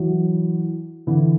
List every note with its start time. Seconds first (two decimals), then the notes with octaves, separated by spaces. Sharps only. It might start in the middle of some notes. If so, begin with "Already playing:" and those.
Already playing: E3 F#3
1.07 D3 E3